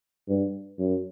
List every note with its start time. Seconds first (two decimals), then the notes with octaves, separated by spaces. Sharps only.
0.29 G2
0.79 F#2